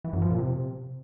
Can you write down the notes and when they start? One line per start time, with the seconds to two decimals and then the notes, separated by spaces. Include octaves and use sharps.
0.04 E3
0.13 F#2
0.22 F3
0.30 A#2
0.39 C3